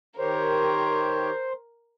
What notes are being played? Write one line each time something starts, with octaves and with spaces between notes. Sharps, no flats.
D#3 G4 A#4 C5 C#5